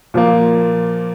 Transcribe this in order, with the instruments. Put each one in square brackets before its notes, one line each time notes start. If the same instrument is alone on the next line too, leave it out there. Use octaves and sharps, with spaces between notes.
[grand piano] A#2 F3 A#3